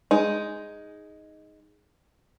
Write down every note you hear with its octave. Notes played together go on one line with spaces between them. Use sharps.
G#3 D#4